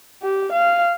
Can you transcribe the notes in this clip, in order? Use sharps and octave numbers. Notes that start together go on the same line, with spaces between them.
G4
F5